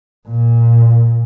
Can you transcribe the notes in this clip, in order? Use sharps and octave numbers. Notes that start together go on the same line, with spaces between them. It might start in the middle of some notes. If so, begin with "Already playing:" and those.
A#2